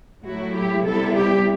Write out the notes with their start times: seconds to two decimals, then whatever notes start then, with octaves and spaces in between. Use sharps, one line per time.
0.23 A2 F#3 A3 E4 F#4
0.53 G4
0.83 C3 G3 B3 E4 A4
1.14 G4